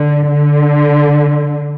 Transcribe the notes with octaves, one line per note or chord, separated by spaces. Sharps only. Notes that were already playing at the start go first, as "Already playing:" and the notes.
Already playing: D3
D3